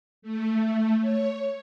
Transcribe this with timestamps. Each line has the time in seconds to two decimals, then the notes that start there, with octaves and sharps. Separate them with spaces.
0.22 A3
0.99 C#5